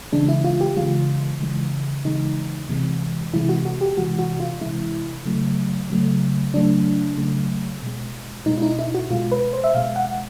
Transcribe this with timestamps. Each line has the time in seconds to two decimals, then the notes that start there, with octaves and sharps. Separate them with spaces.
0.12 C#3 E3 G#3 D4
0.28 E4
0.44 F4
0.61 G4
0.76 C#3 E3 G#3 F4
1.40 C#3 E3 G#3
2.05 C#3 E3 G#3 D#4
2.69 C3 E3 G#3
3.33 C3 E3 G#3 E4
3.49 F#4
3.65 F#4
3.81 G4
3.97 C3 E3 G#3 F#4
4.19 F#4
4.40 F4
4.61 C3 E3 G#3 E4
5.26 C#3 F#3 A3
5.90 C#3 F#3 A3
6.54 C#3 F#3 A3 D4
7.17 C#3 F#3 A3
7.82 B2 G#3
8.46 B2 G#3 D#4
8.58 E4
8.62 D#4
8.79 E4
8.94 F#4
9.10 B2 G#3 F4
9.32 B4
9.53 C5
9.64 E5
9.74 B2 G#3 F5
9.96 F#5